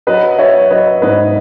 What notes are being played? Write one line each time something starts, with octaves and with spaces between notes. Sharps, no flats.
F#3 B4 D#5
F#3 C#5 E5
F#3 B4 D#5
G#2 B4 D#5